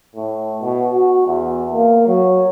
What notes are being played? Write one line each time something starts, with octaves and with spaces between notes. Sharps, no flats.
A2
B2
F#4
E2
A#3
F#3